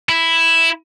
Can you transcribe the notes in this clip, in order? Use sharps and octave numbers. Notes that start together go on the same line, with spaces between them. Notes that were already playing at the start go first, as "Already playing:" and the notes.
E4